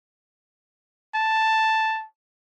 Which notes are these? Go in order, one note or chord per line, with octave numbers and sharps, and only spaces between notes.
A5